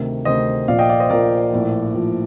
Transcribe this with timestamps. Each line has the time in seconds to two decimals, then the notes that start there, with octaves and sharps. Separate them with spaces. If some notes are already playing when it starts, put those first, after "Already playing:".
Already playing: D2 C3 D#3
0.25 D2 C3 D#3 C5 D#5
0.68 A#1 A#2 F3 D5 F5
0.79 D#5 G5
0.89 D5 F5
1.00 C5 D#5
1.10 A#1 A#2 F3 A#4 D5
1.52 A#1 A2 F3
1.94 A#1 A2 F3